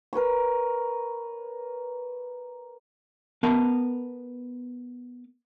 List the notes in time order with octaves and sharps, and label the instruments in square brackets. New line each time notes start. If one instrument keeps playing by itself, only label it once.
[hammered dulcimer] A#4 B4 C#5 C#6
[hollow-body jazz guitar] B3 A#4 B4 A5